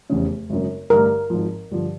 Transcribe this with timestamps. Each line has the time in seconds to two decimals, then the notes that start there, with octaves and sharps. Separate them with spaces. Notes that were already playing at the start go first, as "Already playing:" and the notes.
0.10 F1 E2 C#3
0.50 G#1 F#2 C#3
0.90 A1 G2 D3 A#4
1.30 G#1 G#2 F3
1.71 G2 D3 F3